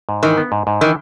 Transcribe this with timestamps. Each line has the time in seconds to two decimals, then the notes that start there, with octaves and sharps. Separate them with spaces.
0.09 G#2
0.23 D#3 E3
0.38 B3
0.52 G#2
0.67 G#2
0.81 D#3 E3